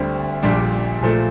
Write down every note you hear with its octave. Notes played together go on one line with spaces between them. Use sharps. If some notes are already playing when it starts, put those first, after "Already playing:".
Already playing: D2 D3 G3 C4
A#1 A#2 G3 D4
A#1 A#2 F3 A3